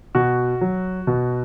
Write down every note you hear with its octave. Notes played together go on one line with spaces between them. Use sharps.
B2 F#4
F#3
B2